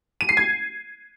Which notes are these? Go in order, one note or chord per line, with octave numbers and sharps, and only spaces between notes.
D#7
C7
G#6